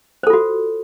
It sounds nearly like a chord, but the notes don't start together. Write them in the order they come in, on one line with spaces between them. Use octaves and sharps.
C5 A4 F4 F#4